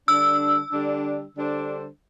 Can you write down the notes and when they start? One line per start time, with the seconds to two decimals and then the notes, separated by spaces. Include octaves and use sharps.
0.08 D3 G3 D4 E6
0.72 D3 G3 D4
1.35 D3 G3 D4 A4 C5